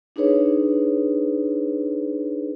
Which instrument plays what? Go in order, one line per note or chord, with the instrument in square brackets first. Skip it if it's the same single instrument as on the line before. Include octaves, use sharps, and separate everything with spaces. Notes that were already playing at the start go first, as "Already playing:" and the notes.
[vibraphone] D4 D#4 G#4 B4 C#5